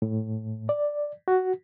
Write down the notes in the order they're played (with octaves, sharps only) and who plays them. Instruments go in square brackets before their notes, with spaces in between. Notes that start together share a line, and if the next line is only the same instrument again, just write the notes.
[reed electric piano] A2
D5
F#4